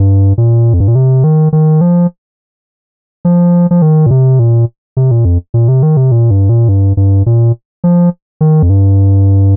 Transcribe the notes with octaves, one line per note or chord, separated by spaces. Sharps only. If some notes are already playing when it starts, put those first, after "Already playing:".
Already playing: G2
A#2
F2
G2
A#2
C3
D#3
D#3
F3
F3
F3
D#3
A#2
C3
A#2
C3
A#2
F2
A#2
C3
D#3
C3
A#2
G2
A#2
G2
G2
A#2
F3
D#3
F2
G2